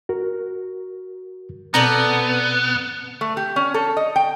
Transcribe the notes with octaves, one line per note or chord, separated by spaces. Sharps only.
F#4 A#4
B2 B3 C4 A4 D5 A#5 G6
A3
G4
C#4
A4
D#5
G5